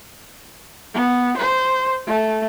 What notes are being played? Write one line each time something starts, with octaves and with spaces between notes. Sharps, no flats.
B3
C5
A3